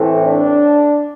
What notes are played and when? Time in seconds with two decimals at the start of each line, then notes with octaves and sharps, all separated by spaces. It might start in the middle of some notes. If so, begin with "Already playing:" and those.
Already playing: A2 E3 A3 C4
0.25 D4